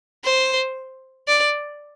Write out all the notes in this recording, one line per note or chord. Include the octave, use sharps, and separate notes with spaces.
C5
D5